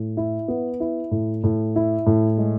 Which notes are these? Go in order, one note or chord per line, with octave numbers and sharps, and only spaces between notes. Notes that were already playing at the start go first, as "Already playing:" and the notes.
Already playing: A2
E4
B3
E4
A2
A2
E4
A2
G#3